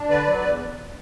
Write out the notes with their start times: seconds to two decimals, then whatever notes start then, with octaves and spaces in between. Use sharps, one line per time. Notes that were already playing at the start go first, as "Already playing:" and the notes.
Already playing: D4
0.09 D3 B4 D5
0.26 F#3
0.43 E2